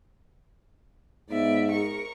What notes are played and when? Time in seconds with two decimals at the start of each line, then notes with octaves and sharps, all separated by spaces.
1.30 G#2 B3 D5 E5
1.71 G#4 A#4 C#6